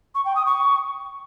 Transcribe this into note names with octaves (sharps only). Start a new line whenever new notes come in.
C#6
G5
D#6
C#6